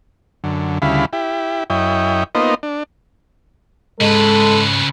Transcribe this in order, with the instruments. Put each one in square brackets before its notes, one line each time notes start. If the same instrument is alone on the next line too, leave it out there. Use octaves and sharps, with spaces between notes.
[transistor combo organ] F#2 D3
D2 C#3 G3 E4 F5 B5
E4 G4
F#2 E4 C#5 D#5 G5
A#3 B3 D#4 F4 C5 D#5
D4
[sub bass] G#2 [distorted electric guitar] C#3 B4 [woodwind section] G#3 [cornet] A4